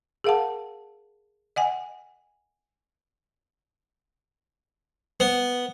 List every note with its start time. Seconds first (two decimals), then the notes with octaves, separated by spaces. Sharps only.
0.24 G#4 A#4 F5 F#5 A5
1.56 D#5 F#5 G#5
5.20 B3